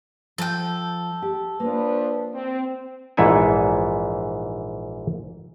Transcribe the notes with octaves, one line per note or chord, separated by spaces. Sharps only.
F3 A4 G5
G4
F3 A#3 D4 B4
C4
A#1 G#2 E3 E4 A4 G#5